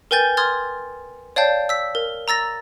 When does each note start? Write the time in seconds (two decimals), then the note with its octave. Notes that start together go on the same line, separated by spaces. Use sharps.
0.11 A#4 B4 G5 G#5 G6 A6
0.37 C6 D#6 F6 G#6 A6
1.36 C#5 D5 F5 G5 A5 G6
1.69 E6 B6
1.95 A#4
2.28 A#5 E6 A6 A#6